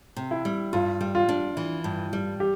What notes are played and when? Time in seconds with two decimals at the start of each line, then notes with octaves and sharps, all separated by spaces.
0.16 C3
0.31 E4
0.45 G3
0.73 G2 F4
1.01 G3
1.15 F4
1.29 D4
1.57 E3
1.84 G2
2.13 G3
2.40 G4